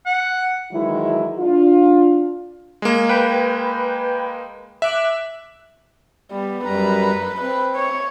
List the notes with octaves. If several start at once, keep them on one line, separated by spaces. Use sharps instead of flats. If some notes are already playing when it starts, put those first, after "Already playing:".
F#5
D#3 E3 F#3 G#3 E4
D4 F4
G#3 A#3
B4 G5
E5 D6 F#6
G3 B3
F#2 G3 B4 A#5
C4 B4
C#5